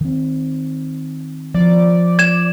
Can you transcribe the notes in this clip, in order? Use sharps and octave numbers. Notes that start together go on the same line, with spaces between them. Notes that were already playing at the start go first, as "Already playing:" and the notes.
D#3 C4
F3 D5
G#6 E7